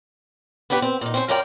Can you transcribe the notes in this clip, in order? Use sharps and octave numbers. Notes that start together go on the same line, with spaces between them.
B3 D4 F#4 G4 B4
C4
A#2 D#4
C4 C#4 C5
F#2 C#4 F4 A#4 D5 G5